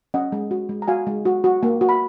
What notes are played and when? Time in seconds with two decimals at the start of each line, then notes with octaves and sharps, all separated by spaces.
0.14 C#4 D#5 F#5
0.32 G#3
0.51 F#4
0.69 G#3
0.82 A#5
0.88 F#4 F5 G#5
1.07 G#3
1.25 F#4
1.44 F#4
1.63 A#3
1.81 F#4
1.89 B5